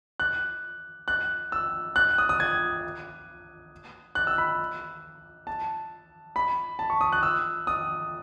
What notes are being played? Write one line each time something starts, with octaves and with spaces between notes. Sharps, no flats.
F#6
F#6
E6
F#6
D#6
D#6
G#6
F#6
E6
B5
A5
B5
A5
C#6
D#6
F#6
E6
D#6